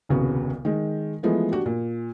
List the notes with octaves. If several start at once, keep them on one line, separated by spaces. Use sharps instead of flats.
D#1 C2 C#3 B3 F#4
D#3 G#3
E3 F3 G#3 A3 B3
D4 F#4 G4
A#2